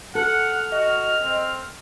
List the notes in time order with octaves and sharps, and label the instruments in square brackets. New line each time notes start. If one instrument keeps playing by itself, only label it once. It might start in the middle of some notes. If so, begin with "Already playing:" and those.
[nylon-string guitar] A4 [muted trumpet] F#5 [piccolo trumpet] F6
[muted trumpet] F#4 [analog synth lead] D#5
[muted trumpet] C4